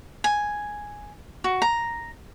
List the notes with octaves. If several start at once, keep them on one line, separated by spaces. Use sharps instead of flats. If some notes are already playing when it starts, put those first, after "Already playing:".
G#5
F#4
A#5